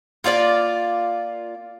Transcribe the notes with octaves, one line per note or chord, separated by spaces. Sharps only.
A#3 F4 F#4 D5